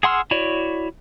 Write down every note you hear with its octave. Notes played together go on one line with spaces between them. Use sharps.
G#4 F#5 C6 E6 F6
E4 F#4 C#5 D5